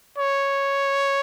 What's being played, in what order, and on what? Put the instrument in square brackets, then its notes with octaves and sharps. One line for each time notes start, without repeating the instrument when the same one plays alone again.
[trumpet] C#5